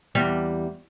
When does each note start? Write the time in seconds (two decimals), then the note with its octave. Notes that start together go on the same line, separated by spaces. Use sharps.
0.15 E2 G3